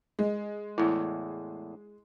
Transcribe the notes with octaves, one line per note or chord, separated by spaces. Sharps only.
G#3
E2 A2 E4